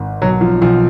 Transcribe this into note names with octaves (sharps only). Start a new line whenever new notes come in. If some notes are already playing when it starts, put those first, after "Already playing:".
Already playing: G#1
B1 F#3
F3
B1 F3